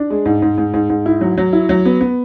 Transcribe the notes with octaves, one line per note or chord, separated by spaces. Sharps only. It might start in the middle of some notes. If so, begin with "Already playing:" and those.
Already playing: D4
G#3
G#2
G#2
G#2
G#2
G#2
E4
F#3
F#3
E4
F#3
B3
B3